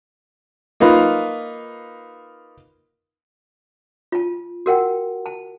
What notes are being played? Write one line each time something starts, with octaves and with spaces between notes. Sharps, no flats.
A#3 D#4 F4 B4
F4 A5
F#4 A#4 F#5 G5
A5